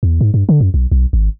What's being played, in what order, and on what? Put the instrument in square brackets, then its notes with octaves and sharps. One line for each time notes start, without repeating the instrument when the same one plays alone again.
[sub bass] E2
G#2
G2
D3
F#2
B1
B1
G#1